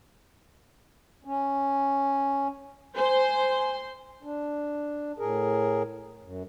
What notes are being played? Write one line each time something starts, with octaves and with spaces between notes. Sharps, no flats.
C#4
C5 G#5 C6
D4
A2 G#4 A#4
F#2